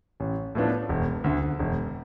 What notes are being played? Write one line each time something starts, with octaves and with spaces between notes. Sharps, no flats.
A1
A2 F3 B3 D4
E1
D2 D3
E1